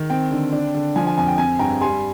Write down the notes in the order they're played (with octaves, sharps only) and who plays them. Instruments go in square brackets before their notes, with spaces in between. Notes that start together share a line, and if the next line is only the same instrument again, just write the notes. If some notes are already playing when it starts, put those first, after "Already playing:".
Already playing: [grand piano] D#3
C4 G5
D3
D4
D3
F3 G#5
G#5
F2 G#5
G5
C4 G#5
G2 G5 A#5
G3 G#5 C6